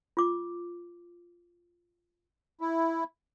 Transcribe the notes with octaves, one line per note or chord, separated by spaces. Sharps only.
F4 D6
E4